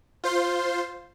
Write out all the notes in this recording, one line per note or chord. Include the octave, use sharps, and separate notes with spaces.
F4 C5 C6